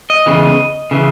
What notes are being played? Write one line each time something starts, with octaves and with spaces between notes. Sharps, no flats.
D#5
E2 C#3 E3
C#3 E3